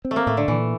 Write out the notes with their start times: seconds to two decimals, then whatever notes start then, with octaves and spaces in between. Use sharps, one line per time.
0.05 C4
0.11 A3
0.16 A#3
0.27 A2 A3
0.37 D3
0.48 A#2 E3